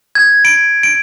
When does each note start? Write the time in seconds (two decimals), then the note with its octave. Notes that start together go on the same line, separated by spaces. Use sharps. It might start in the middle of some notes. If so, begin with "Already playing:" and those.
0.15 G#6
0.45 D7
0.83 D7